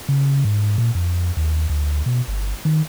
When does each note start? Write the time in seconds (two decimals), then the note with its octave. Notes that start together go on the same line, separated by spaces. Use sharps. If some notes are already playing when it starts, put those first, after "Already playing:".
0.09 C#3
0.45 G#2
0.78 A#2
0.95 F2
1.37 D#2
1.70 D2
2.06 B2
2.28 G1
2.65 D#3